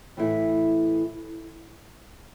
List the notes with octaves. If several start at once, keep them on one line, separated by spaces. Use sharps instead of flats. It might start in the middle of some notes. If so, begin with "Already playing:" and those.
A2 E3 A3 E4